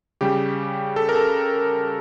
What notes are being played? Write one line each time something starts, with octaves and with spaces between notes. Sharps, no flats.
C#3 G3 G4
A4
A#4
A4